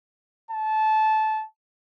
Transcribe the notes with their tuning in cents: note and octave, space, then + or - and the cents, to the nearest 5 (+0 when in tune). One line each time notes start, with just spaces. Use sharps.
A5 -20